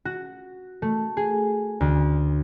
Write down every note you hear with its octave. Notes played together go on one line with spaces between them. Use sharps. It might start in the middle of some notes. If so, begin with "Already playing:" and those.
F#4
A3
G#4
D2